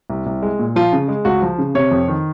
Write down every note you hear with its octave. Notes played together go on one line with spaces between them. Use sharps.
C2
C2
G#3
A#2
F3 F4
C#3
G#3
C#2 F#4
F3
C#3
C3 C#5
F2
D#3